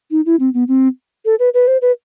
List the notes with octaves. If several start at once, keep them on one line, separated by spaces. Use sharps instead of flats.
D#4
E4
C4
B3
C4
A4
B4
B4
C5
B4